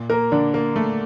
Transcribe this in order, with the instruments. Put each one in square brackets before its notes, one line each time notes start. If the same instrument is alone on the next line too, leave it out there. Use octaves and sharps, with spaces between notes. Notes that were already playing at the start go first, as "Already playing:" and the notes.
Already playing: [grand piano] A#2
A#3 A#4
D3 D4
A#3
A3